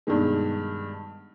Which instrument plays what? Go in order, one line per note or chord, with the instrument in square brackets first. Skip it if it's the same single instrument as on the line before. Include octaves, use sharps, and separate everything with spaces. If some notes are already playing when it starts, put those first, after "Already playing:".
[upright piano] G2 B2 D#3 G#3